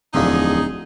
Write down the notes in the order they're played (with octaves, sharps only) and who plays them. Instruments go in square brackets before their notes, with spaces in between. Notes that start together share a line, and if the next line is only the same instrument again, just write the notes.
[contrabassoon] D1 [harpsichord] E2 D3 F3 [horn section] D#4 G#4